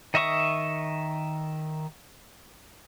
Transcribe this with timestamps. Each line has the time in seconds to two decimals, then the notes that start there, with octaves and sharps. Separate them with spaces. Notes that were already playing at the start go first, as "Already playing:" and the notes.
0.14 D#3 D#5 E5 C#6 D#6